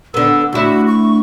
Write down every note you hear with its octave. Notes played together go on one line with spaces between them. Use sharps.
D3 B3 E6
D2 E4 F#4
C#6